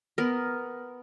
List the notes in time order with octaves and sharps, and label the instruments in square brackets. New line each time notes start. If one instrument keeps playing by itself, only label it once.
[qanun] B3 A#4